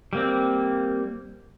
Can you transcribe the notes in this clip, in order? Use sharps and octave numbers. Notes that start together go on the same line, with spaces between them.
G3 A#3 C4